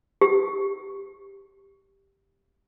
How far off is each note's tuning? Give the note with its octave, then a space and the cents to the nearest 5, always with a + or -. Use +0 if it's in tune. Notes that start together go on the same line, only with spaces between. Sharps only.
G4 +0